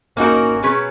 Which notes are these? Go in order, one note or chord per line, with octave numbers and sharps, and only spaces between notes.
A#3 C#4 D#4 F#4 A#4
B2 F#3 C#4 G#4 B4